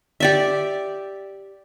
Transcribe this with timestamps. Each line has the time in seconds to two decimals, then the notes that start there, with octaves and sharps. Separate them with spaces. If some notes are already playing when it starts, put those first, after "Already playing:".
0.20 G4 D5 E5